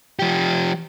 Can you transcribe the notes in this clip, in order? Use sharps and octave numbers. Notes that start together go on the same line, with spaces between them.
F3 G4